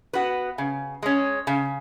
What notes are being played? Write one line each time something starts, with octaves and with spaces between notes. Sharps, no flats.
B3 F#4 B4
C#3
G#3 C#4
C#3